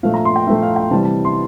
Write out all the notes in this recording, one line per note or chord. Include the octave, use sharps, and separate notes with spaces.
A#2 F3 A3 F5
A#5
C6
G5
A#2 F3 A3 E5
F5
G5
C3 E3 G3 A5
A5
C6